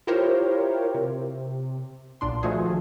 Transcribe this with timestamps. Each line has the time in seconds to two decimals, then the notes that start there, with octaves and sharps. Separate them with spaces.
0.07 E4 F4 G4 A#4 C5 C#5
0.94 C3
2.21 B1 A#2 D4 C6
2.43 D#3 F3 A3 F4 F#4 G#4